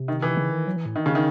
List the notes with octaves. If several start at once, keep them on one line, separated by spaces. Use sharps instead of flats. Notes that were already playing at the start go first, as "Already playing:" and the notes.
Already playing: C3
D#3
E3
C#3
D#3
F#3
E3
A2
D#3
C#3
D#3